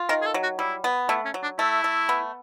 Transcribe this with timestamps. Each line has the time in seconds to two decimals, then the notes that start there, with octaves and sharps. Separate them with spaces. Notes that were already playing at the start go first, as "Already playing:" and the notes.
Already playing: F4
0.09 D#3 A#4
0.22 G#4
0.26 A4
0.34 F#3
0.43 F#4
0.59 G3 E4
0.84 B3
1.08 A3 E4
1.25 C#4
1.34 F#3
1.43 D4
1.58 A3 E4
1.84 A3
2.09 B3